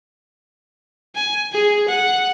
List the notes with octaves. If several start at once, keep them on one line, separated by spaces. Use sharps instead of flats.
G#5
G#4
F#5